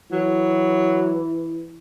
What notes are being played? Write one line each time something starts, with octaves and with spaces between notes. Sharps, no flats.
E3 F#3